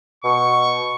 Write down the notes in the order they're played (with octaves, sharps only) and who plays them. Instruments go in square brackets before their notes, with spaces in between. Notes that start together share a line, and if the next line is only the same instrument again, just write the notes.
[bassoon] B2 [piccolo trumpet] C#6